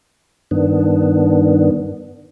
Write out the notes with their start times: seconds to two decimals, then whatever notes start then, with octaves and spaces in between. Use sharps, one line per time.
0.51 G2 D#3 B3 D4